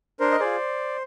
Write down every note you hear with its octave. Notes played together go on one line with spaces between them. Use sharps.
D4 A#4 C5
D#5
F4 G#4 C5 D5